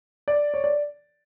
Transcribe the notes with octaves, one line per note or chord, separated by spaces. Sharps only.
D5
C#5
D5